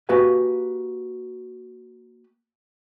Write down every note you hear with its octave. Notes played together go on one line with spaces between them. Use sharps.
A#3 F#4 G4 B4 F5 G#5